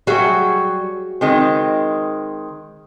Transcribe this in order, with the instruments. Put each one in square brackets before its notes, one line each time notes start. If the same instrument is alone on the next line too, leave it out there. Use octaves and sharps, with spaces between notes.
[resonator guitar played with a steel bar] F#3 G3 [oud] F#4 G#4 E5
[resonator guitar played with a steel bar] D#3 G#3 C4